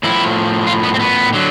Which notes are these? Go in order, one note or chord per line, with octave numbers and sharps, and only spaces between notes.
A2 F3 E4
F4
B3
C4
B3
D3 F#3